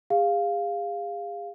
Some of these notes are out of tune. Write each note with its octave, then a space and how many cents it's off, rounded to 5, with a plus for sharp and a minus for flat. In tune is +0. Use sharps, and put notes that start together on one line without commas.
G#4 -40 F5 +0